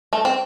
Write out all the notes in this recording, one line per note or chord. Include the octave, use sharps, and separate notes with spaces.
A3
C4